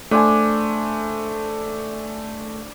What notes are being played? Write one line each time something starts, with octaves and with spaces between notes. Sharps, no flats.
A3 D4 C5 G#5